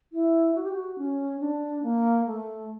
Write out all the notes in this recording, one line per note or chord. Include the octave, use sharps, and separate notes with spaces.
E4
F#4
G4
F#4
C#4
D4
A#3
A3